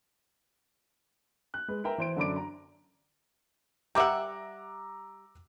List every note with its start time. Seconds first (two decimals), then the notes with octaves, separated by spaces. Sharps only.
1.54 F#6
1.68 G#3 B4
1.84 A#4 B4 E5 G5 A#5
1.98 E3 C5 D7
2.17 F#2 D3 D4 B5 D6 D7
2.36 A#5
3.95 G3 E5 F#5 A#5 D6 E6